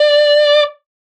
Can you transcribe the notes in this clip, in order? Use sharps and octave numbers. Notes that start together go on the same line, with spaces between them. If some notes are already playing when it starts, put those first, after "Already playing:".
Already playing: D5